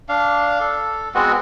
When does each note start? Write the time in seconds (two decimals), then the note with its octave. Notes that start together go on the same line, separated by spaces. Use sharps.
0.09 D4 F5
0.60 A4
1.15 G#3 B3 C4 F#4